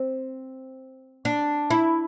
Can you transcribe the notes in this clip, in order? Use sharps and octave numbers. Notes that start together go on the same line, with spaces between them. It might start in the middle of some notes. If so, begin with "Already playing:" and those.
Already playing: C4
D4
E4